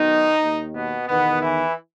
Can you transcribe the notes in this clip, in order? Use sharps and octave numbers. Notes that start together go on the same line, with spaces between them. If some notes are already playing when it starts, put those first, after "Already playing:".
Already playing: B1 B2 D#3 D#4
D#2 D#3
B2 B3
E2 B2 D#3 B3
E3 E4